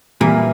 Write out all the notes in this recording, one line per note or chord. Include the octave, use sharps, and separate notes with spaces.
A#2 E3 G3 A#3